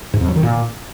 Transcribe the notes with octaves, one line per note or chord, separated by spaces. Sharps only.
G#2
F2
F#3
D#3
A#2